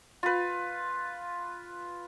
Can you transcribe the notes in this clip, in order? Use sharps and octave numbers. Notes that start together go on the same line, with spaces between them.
F4 B4